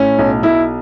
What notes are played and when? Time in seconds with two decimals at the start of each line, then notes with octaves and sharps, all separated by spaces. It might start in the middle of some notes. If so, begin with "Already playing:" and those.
Already playing: A2 C#4
0.19 B1
0.43 B1 E4